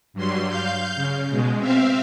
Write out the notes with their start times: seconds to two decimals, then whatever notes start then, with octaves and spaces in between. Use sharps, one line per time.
0.13 G2 F#3 G3 C6
0.48 F5 G6
0.95 C#3
1.30 B2 G#3
1.58 C4 E5 F5